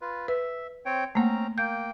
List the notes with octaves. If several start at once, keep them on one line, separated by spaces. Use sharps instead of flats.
F4 B4
B4 E5
C4 C#5 G5
A3 A#3 C4 C#4 F#5 A#5
A#3 G5 G6